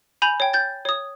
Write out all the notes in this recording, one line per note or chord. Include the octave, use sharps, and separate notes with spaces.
G#5 B5 G6 F7
C#5 G5
G6 A6
C#5 D#6